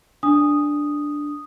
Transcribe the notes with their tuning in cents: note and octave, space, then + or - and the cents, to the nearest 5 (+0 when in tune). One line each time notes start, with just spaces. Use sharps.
D4 +0 D#6 -5